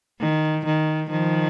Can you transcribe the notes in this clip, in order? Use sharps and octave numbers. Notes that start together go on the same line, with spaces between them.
D#3
D#3
D#3 F3